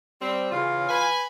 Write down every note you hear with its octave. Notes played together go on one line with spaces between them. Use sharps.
G3 C4
C#3 E3 F4 F5
B4 G#5